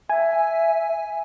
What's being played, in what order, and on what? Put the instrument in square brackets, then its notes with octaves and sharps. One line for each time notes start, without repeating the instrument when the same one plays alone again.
[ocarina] E5 [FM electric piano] G#5